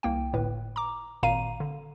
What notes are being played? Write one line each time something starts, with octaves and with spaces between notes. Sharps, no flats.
C2 A#3 G5
G1 A2 B4
A#5 D6
G#1 A#2 F5 A#5 D#7
D3